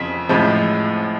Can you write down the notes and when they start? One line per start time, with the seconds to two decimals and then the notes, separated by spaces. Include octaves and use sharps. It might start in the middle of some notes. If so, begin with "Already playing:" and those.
Already playing: F2 C#3 B6
0.29 A1 A2 F3 G#3